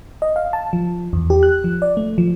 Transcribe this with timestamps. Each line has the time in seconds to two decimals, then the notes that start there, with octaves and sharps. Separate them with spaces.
0.22 D#5
0.36 F5
0.53 A5
0.73 F3
1.13 E2
1.30 G4
1.43 F#6
1.64 F3
1.82 D5
1.97 A3
2.18 F3